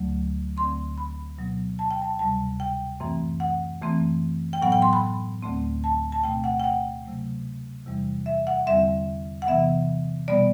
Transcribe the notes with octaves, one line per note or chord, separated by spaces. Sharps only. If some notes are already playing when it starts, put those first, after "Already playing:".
Already playing: D2 D3 F#3 A3
D2 D3 A3 C4 C6
B5
B2 F#3 B3
A5
G5
A5
D2 C3 G3 A5
G5
F#2 E3 A3 C4
F#5
F#2 E3 A3 C4
G5
A2 F#3 B3 F#5
G5
C6
B5
D2 D3 A3 C4
A5
A5
B2 A3 C4 G5
F#5
G5
F#5
C3 F#3 A3
E2 C3 E3 G3
E5
F#5
E2 D3 G3 C4 E5
F#5
C3 E3 B3 E5
B2 G3 B3 D5